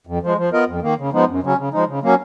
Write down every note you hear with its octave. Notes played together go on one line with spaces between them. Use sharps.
F2
F3 G#3
F3
B3 F4 A#4 D#5
F2
D#3 A#3
C#3
F3 G#3 B3 D#4
F#2
C#3 F#3 C#4
C#3
F3 G#3 D#4
C#3
F#3 A#3 C#4